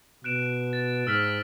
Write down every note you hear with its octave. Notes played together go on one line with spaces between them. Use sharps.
B2 F#6 D7 E7
A6
G#2 E6 F6 B6